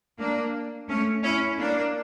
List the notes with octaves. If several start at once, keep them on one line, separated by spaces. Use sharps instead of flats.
A#3 D4
A3 C#4
C#4 E4
A#3 D4